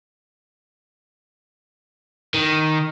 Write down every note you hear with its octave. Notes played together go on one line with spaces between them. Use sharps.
D#3